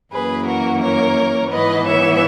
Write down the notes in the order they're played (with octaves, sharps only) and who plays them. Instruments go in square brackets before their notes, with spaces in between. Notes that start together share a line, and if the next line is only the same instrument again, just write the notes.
[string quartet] F#2 E3 A#3 G#4 B4
F#4 A#4
A#4 C#5
G#2 E3 B3 B4 D#5
C#5 E5